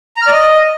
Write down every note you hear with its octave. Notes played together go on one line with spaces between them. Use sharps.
A#5
F6
D5
D#5